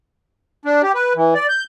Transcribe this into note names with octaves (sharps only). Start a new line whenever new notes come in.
D4
G4
B4
E3
D5
G6